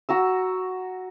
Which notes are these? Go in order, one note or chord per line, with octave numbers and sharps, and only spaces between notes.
F#4 A#5 E6